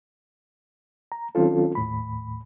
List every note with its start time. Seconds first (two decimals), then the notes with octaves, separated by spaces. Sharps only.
1.12 A#5
1.35 D#3 F#3 C4 C#4 F4 A4
1.75 D#2 A2 B5